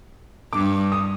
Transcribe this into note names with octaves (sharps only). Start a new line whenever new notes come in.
G2 D6
D#6